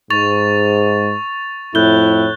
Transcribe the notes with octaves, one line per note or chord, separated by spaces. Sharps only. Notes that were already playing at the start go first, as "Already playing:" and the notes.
G#2 C#6 A6 F7
F2 A2 E4 F#6 G6 G7